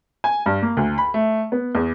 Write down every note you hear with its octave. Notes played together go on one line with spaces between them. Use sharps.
G#5
G2
A#3
D2
B5
A3
B3
E2